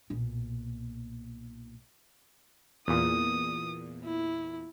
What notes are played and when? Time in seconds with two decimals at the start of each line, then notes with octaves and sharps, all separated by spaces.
0.10 B1 A#2
2.88 E2 A#2 D#6
4.05 E4